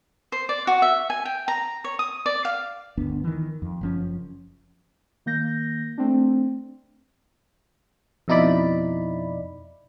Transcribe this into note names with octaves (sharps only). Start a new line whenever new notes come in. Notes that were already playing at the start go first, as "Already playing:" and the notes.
C5
D5
F#4
E5
G#5
G5
A#5
C#5
D#6
D5
F5
G1 D2 B3 D4
D#3 E3
F2
F#1 F3 C#4
D#3 A#3 G6 A#6
A3 C4 D4
F2 B2 D#4 E4 D5 B5